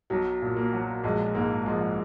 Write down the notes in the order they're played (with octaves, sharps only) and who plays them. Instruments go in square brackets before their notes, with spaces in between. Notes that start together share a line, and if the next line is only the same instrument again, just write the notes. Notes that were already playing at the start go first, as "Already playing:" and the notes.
[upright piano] B1 [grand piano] F#3
[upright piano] A#2
[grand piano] A#3
[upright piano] F#3
[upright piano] A#1 [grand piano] G#3
[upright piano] G#2 [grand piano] A#3
[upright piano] F3 [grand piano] G#3